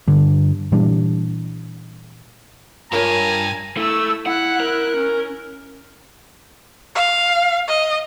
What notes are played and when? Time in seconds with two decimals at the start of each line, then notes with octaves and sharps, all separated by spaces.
0.08 G2 D3
0.72 A#2 E3 G3 D4
2.92 G2 F4 A#4 C#5 G#5 A#5
3.77 A3 E4 E6
4.26 E4 F#5 F#6
4.60 A#4
4.97 C#4
6.95 F5
7.68 D#5